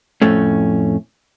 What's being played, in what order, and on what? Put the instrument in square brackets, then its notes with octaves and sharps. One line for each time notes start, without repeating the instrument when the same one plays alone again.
[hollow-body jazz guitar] F2 A2 A3 C#4